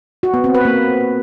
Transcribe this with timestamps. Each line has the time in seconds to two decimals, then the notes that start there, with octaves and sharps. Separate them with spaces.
0.23 F#4
0.34 B3
0.44 C4
0.55 B4
0.65 A#3